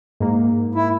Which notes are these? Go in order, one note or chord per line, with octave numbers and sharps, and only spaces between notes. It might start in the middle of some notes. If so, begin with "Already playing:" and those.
G#2 A#3
E4